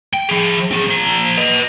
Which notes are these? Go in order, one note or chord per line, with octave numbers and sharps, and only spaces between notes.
G5
F3 G#4
C4 G#4
F3 A#5
B4 D#5